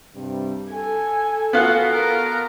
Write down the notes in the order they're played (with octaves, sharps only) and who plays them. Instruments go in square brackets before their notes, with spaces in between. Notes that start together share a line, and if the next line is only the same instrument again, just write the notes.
[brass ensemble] G2 C3 G3
[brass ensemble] A4 [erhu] G#5
[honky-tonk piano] B3 F4 F#4
[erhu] A#4